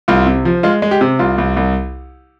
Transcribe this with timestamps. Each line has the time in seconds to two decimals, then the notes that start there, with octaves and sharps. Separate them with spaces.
0.08 C2 F4
0.27 C3
0.45 F3
0.63 G#3 F4
0.82 G#3
0.91 G4
1.01 C3
1.19 C2 F4
1.38 C2
1.56 C2